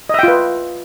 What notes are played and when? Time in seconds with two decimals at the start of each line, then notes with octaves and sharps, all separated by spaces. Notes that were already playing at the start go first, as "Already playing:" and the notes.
0.09 D#5
0.14 E5
0.19 G5
0.23 F4
0.28 B4